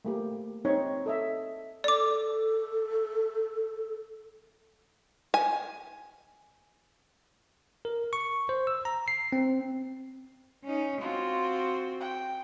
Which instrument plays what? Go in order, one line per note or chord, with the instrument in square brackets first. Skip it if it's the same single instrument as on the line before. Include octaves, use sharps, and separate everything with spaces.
[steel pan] A3 A#3 G4
C4 D#4 C#5
A4 D#5 E5
[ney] A4 [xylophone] D5 D6
[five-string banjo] G#5
[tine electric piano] A#4
C#6
C5
E6
A#5
C7
C4
[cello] C#4 D#4
[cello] C4 F#4 [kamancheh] F4
[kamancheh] G5